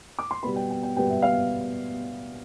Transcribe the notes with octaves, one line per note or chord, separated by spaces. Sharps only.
D6
C6
B2 G3 B3 B5
G5
G5
G5
B2 G3 B3 G5
E5
F5